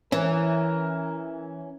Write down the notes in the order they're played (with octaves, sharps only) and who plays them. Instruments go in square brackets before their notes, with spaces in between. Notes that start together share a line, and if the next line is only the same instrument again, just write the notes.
[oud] E3 [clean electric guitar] C#4 [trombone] A#4